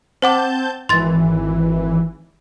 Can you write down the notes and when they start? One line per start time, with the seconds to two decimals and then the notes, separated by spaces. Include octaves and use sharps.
0.22 C4 C5 F#5 A5 D6 G6
0.89 G#1 E3 C6 A6